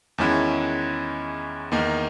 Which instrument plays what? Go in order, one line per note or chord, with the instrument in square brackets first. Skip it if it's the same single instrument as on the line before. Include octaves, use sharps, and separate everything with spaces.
[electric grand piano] E2 D#3 G#3 C#4 E4
E2 D#3 A#3 D#4